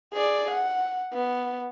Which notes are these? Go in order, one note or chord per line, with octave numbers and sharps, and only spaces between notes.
G#4 D5
F#5
B3